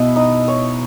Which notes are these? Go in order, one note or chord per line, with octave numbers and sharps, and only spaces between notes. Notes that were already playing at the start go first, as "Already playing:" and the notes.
Already playing: B2 E4 D#5
D#4
C#5